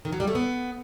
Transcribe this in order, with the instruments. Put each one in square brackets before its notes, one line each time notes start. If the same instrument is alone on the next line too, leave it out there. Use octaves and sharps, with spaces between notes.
[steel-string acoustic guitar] D#3
F#3
G3
A3
B3